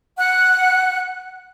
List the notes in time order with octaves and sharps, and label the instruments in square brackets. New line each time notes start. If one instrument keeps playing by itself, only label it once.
[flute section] F#5 F#6